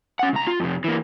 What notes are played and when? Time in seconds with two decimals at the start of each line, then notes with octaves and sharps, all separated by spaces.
0.19 C#4 F#5
0.33 C2 A#5
0.47 F4
0.60 F2 C3
0.84 E3 A#3